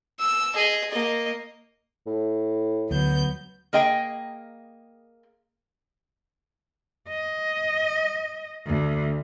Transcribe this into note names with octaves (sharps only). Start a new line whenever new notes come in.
E6
G#4 D#5
A#3 D#5
A2
D2 F#3 B3 G6
A#3 G#4 D#5 G5
D#5
D2